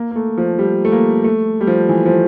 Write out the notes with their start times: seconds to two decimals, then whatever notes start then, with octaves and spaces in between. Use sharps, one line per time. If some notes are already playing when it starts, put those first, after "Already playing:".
Already playing: A#3
0.11 A#3
0.16 A3
0.38 F3
0.59 G3
0.85 A3
0.92 A#3
1.24 A3
1.61 G3
1.67 F3
1.89 E3
2.06 F3